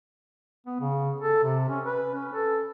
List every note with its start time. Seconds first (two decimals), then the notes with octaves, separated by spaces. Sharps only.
0.66 B3
0.80 C#3
1.20 A4
1.43 C3
1.69 C#4
1.85 B4
2.14 C#4
2.33 A4